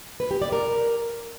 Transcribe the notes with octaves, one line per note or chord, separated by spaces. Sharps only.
B4
G4
D5
A#4